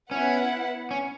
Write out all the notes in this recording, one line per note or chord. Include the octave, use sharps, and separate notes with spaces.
B3 C#4 E4 B4 F#5
C#4